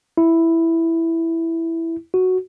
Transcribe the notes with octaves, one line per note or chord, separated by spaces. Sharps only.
E4
F#4